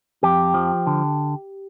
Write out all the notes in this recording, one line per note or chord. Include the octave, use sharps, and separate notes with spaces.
F2 G4
F3
D3